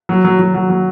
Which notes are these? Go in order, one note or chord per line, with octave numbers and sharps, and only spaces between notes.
F#3
F#3
F#3
F#3
F#3